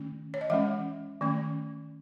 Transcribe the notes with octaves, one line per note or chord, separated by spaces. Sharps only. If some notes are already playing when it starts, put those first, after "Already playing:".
Already playing: D#3 A3 C#4
C#5
D#5
E3 G#3 C#4 E5
D#3 A3 C#4